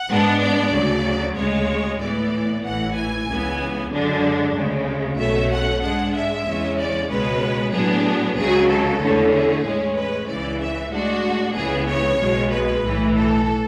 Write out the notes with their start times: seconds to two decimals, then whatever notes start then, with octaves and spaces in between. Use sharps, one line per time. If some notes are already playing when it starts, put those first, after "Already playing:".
Already playing: F#5
0.09 G#2 G#3 B3 D4
0.40 D5
0.72 D2 C#3 F#3
1.36 D2 C#3 G#3 C#5
2.00 A2 E3 B3 D5
2.63 A1 A2 E3 F#5
2.95 G#5
3.27 C#2 C#3 E3 B3
3.90 F#2 D3 G#3 D4
4.54 D2 C#3 G#3
5.18 B1 B2 A3 C#4 E5
5.51 F#5
5.82 G#2 G#3 D4 F#5
6.14 E5
6.46 E2 C#3 G#3 C#4
6.78 D5
7.10 C#2 B2 G#3 C#4 B4
7.73 A2 F#3 B3 D4 G#4
8.37 C#2 C#3 F#3 G#4
8.68 A4
9.01 E2 D3 A3 C#4
9.33 G#4
9.65 A2 G#3 C#4
9.96 B4
10.28 C#2 C#3 E3 D5
10.60 E5
10.92 A2 G#3 D4 F#4
11.56 C#2 C#3 E3 B3 G#4
11.88 C#5
12.19 B1 B2 G#3
12.51 B4
12.83 B1 A2 E3
13.15 A4